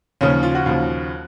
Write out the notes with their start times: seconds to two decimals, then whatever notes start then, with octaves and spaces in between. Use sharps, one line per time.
0.21 D#2 C#3 F3 C#4
0.43 F4
0.55 F#4
0.66 D#2 C#3 F3